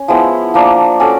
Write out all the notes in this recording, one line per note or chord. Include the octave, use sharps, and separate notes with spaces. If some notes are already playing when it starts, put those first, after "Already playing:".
Already playing: C#4
F3 G#3 B3 E4
F3 A#3 D4
C#4 F#4 A4 D5